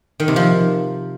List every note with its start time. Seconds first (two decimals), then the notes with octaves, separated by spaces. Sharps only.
0.20 D#3
0.28 C3
0.36 F3